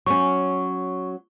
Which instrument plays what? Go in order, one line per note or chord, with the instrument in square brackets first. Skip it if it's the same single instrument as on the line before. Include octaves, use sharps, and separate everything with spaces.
[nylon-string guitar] F#3 C#4 [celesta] C#6